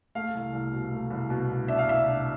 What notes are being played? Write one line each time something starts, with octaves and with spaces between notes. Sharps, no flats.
A3 F5
C2
C2
B2
A3
C2
B2
C2
D4 E5
F5
C2 E5
D4